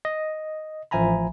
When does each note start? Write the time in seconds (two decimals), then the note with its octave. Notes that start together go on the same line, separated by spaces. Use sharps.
0.05 D#5
0.91 A1 F3 E5 G#5 A#5 B5